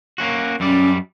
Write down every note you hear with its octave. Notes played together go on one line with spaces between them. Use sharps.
A#3 C#4 F#4
F#2 G3 C#4 D5